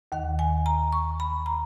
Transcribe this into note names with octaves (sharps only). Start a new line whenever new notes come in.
D#2 D#3 F#5
G#5
A#5
C#6
B5
A#5